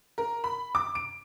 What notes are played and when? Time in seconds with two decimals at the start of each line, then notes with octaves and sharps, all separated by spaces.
0.18 A#4
0.44 B5
0.75 D6
0.95 D7